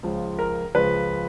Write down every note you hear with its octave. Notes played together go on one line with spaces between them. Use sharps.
C#2 C#3 F3
A#4
C#2 C#3 F3 B4